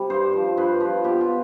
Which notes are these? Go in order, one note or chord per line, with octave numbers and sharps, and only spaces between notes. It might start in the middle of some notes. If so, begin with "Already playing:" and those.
Already playing: C3 G3
G2 C5
F3
G2 B4
F3
B2 G4
F4